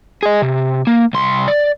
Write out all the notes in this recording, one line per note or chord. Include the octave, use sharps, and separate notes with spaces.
G#4 D#5
C3
A#3
C2 C6
D5